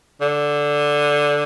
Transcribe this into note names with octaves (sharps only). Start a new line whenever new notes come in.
D3